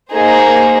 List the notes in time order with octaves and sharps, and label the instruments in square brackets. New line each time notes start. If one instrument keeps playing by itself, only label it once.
[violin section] A#3 D#4 G#4 C5